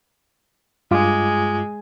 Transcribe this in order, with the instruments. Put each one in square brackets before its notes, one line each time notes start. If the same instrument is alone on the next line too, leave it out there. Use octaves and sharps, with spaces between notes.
[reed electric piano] G2 F4 D6 [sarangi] G#3